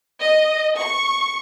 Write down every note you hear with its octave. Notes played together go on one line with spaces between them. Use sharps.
D#5
C#6